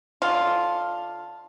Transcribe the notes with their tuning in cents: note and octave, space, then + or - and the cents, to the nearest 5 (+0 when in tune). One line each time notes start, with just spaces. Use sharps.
D3 +0 F4 +0